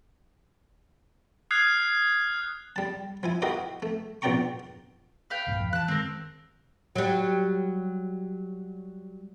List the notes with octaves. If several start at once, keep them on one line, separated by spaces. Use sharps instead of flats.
D#6 F6 F#6 G#6 C7 F7
G3 A5
F3 E4 G#5
E4 F#4 G4 A#4 D#5 F5
A3
A#1 B2 D5 G5 A#5 C#6
B4 F5 G5
B1 G2 A#2
F2
E3 A5 F#6
D#3 G#3 C4 A#4
F#3 G3